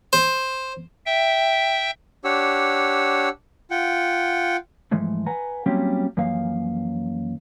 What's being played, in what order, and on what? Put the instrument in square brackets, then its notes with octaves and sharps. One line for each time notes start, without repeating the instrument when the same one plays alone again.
[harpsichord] C5
[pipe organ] E5 G5
[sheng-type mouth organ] D4 G4 C#5 F#5 E6
F4 F#5 G5
[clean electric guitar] G#2 E3 F3 G#3 A3
B4 F#5 G#5 A#5
F#3 G3 A#3 C4 C#4 G4
F#2 E3 F3 A#3 F5